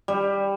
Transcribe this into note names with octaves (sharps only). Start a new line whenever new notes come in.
G3